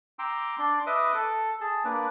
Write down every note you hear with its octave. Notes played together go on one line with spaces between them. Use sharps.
G5 A#5 C6 D6 E6
D4 D5 C6
B4 D#5 E5 D6 D#6
A4
G#4 A5
A#3 D4 B4